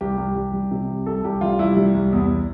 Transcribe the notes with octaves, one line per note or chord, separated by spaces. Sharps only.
C2 G4
C2
C2
G3
C3
C2
C2 A4
C2 G4
G3 F4
C2 E4
G3
C2
E2